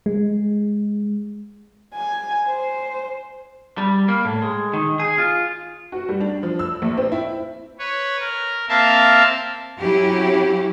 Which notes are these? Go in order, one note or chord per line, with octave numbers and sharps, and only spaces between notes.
G#3
G#5
C5
G3
A#3
A2
G#3
D#3
G#4
F4
F#4
G3
D4
F3
E6
A#1
C4
E4
B4 C#5
A#4
A#3 C4 E5 F5 A5
F#3 C#4 E4 F#4 G4